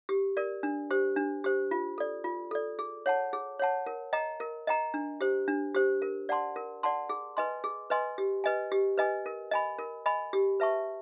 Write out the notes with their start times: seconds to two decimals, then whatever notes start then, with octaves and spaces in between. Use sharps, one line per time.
0.09 G4
0.37 A#4 D5
0.63 D4
0.91 G4 C5
1.16 D4
1.44 G4 C5
1.71 F4
1.98 A4 D5
2.24 F4
2.51 A4 D5
2.79 G#4
3.06 C#5 F#5 A5
3.33 G#4
3.60 C#5 F#5 A5
3.86 A#4
4.13 D#5 G5 A#5
4.40 A#4
4.67 D#5 G5 A#5
4.94 D4
5.21 G4 C5
5.48 D4
5.75 G4 C5
6.02 A#4
6.29 D5 F#5 A5 C6
6.56 A#4
6.83 D5 F#5 A5 C6
7.09 G#4
7.37 B4 D#5 G#5 C6
7.64 G#4
7.90 B4 D#5 G#5 C6
8.18 G4
8.44 B4 D#5 G#5
8.72 G4
8.98 B4 D#5 G#5
9.26 A#4
9.51 D#5 G#5 B5
9.79 A#4
10.06 D#5 G#5 B5
10.33 G4
10.60 B4 E5 A5 C#6